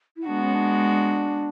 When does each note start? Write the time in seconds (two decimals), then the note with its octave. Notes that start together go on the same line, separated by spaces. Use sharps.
0.17 E4
0.26 G#3 B3 D4 F#4
0.43 C#4
0.55 D4